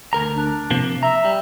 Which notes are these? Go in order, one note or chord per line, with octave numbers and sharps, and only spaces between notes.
D2 A#4 A#5
D4
C3 F3 A#3
E5 A#5
G3